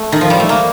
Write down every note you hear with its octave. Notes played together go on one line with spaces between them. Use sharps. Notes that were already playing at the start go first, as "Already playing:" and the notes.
Already playing: A3
D#3
F3
G3
A3
A#3